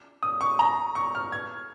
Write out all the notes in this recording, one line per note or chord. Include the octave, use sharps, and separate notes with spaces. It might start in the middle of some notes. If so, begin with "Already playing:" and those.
D#6
C#6
A#5
C#6
F6
G#6